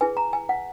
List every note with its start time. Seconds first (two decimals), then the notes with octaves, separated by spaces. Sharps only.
0.01 E4 G#4 B4 G#5
0.17 A#5
0.33 G#5
0.49 F#5